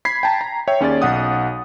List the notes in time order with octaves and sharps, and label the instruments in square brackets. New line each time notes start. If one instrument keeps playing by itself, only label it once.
[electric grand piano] B5 G#6 B6 C7
G5 A5 A#5
A#5
C#5 E5 G5
D#2 C#4 G#4 D5 A6
B1 F#5 D#6